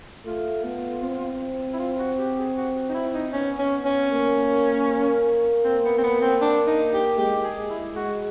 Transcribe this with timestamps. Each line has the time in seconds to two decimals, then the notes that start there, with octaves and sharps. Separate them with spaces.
0.25 A3 F4
0.63 B3
1.02 C4
1.73 E4
1.79 F4
1.99 F#4
2.18 G4
2.38 G#4
2.56 F#4
2.89 D#4
2.94 E4
3.14 D#4
3.33 B3 C#4
3.58 C#4
3.85 C#4
4.10 A#3
5.64 C4
5.84 B3
5.98 C4
6.04 B3
6.22 C4
6.41 D4
6.67 D#4
6.93 G4
7.18 G#3 G4
7.44 G#4
7.70 E4
7.95 G#3 F#4